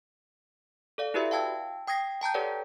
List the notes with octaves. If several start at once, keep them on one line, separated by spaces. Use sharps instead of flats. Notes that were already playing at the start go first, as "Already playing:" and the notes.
A4 D5 F5
E4 F#4 G4 B4 D5 E5
F5 G5 A5 E6 G#6
G5 D#6 G#6 A#6 C7
G5 A5 A#5 G6
G4 A4 B4 C#5 D5 F#5